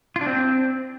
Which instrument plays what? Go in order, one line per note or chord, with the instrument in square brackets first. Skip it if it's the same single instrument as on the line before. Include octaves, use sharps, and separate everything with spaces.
[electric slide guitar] F4
D4
C4